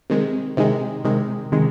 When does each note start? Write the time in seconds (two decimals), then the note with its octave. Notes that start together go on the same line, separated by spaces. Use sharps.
0.10 C3 D#3 G#3
0.57 C3 D#3 G#3
1.04 C3 D#3 G#3
1.52 C3 D#3 G#3